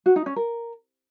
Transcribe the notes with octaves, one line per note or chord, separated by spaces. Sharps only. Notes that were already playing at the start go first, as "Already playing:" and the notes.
F#4
D#4
C#4
A#4